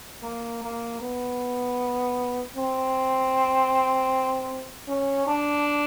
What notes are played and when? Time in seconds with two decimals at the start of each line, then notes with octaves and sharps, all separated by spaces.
0.23 A#3
0.63 A#3
1.02 B3
2.56 C4
4.88 C#4
5.27 D4